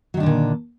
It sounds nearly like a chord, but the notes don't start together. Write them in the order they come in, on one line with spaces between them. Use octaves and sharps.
F#3 D#3 D4 D3 A#2